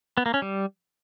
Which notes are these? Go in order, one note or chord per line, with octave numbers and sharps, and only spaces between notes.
B3
A#3
C#4
G3